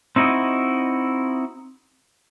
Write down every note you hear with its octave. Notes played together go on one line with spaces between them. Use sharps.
C4 D#4 E4 F#4 D#5